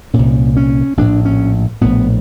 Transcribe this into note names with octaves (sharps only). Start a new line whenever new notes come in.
C2 A#2 C#4
C#4
A#1 A2 D4
C#4
A#1 A2 B3